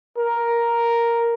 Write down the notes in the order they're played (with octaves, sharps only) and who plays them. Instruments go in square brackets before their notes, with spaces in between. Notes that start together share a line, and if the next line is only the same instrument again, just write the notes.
[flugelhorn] A#4